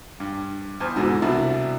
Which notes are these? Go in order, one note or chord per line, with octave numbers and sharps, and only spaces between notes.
G2
E2 C5 F6
G#2 B2 D3 E3 G#3
C2 B2 D4 E4 D5 B5